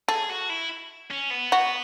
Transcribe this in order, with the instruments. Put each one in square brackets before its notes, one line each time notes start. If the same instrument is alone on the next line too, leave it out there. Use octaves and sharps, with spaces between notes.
[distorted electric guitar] G#4 [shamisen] A4
[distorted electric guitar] F#4
E4
C#4
B3
[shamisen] F#4